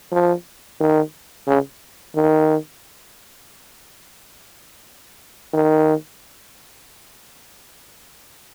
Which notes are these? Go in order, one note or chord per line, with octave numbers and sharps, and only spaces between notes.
F3
D#3
C#3
D#3
D#3